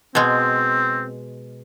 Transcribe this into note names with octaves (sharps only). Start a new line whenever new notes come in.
B2 G#3 C4